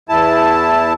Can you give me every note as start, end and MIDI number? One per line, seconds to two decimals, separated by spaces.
0.09 0.93 40
0.09 0.93 64
0.09 0.93 81